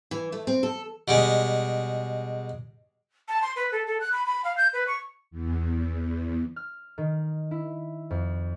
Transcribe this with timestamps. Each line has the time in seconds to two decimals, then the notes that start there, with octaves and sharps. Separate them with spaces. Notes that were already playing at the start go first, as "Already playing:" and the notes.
0.11 E3
0.32 A3
0.47 C4
0.63 A4
1.08 B2 G3 G#3
3.28 A5
3.42 C6
3.56 B4
3.72 A4
3.87 A4
4.00 F#6
4.13 B5
4.27 B5
4.45 F5
4.57 G6
4.73 B4
4.87 C#6
5.31 E2
6.56 F6
6.98 D#3
7.51 E4
8.10 F2